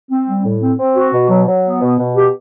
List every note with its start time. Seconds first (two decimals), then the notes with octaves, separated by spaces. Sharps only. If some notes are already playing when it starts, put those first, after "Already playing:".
0.10 C4
0.27 G3
0.44 A2
0.61 C4
0.78 C4
0.96 F#4
1.14 B2
1.29 F#3
1.47 F#3
1.65 B3
1.81 B2
1.99 B2
2.15 G4